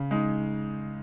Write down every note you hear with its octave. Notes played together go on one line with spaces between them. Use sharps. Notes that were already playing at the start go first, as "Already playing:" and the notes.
Already playing: C#3
G#3 D#4